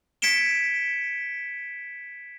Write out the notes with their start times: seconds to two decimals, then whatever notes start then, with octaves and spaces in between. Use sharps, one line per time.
0.22 G#6 B6 C#7 D7 E7 G7